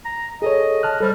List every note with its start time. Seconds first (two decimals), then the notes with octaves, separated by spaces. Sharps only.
0.05 A#5
0.42 G#4 A4 C#5 D#5
0.83 A5 F6 F#6
1.00 G3 A4 C5 F6